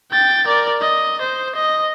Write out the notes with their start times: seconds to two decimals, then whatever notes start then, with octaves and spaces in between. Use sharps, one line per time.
0.11 G5 A6
0.46 A#4 D5
0.81 D#5
1.21 C5
1.55 D#5